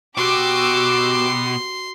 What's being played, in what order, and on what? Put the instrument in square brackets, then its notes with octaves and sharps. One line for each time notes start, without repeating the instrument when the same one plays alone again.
[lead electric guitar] B2 [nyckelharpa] F#4 [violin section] G4 D6 E6 [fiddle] C6